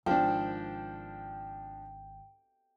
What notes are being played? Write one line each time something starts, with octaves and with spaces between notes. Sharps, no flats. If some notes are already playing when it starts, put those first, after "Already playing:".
D1 G#1 F3 D4 G5